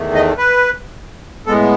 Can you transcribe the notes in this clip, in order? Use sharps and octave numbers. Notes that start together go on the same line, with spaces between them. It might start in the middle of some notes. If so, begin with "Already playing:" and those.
Already playing: E2 D#3 A3
D#5
B4
A2 G#3 B3 A4